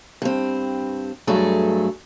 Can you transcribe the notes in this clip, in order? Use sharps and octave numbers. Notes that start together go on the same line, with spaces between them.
G2 C4
G2 F#3 A3 G#4 A4